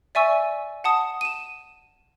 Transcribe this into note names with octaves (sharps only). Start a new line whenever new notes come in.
D5 E5 G#5 C#6 E6
F#5 A5 D#6
D#7 E7